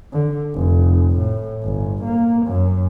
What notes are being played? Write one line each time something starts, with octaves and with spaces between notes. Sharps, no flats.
D3
F1
A2
G1
A#3
F#2